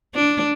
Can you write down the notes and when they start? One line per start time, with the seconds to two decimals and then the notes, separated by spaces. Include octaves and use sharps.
0.15 D4